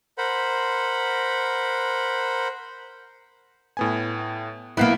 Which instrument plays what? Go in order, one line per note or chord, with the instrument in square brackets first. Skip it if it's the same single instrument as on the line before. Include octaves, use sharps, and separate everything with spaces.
[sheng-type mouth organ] A#4 C5 F#5 B5
[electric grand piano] A2 B3 G#5
[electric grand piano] B1 F#6 C7 [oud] A#3 B3 E4